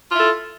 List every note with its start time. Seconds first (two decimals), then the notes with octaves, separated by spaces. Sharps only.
0.11 F4
0.15 E4
0.19 A4